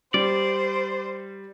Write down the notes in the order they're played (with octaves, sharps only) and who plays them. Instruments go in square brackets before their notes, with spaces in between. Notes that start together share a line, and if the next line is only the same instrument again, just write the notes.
[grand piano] G3 [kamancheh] C5 [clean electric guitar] D5